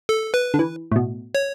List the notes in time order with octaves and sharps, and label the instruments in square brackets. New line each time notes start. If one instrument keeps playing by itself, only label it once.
[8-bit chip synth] A4
B4
[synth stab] D3
E3
A2
B2
[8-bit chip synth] C#5